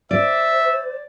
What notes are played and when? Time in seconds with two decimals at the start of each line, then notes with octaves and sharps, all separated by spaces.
0.11 C5 D5 E5